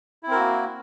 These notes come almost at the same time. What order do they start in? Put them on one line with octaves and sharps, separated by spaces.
E4 C4 A#4 F#4 A#3